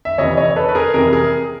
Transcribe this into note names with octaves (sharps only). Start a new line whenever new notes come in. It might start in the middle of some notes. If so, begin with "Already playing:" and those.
E5
F2 C3 E3 C#5 D#5
C#5 D#5
A4 B4
B4
G#4 A#4
F2 C3 E3 G#4 A#4
G#4 A#4